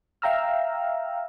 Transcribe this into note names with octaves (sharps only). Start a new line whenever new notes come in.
E5 F5 G5 A#5 E6 F6